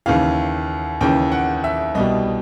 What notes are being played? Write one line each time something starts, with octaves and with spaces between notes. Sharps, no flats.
D#2 C#3 E3 F5
D#2 C#3 E3 G5
F#5
E5
C2 B2 G3 D#5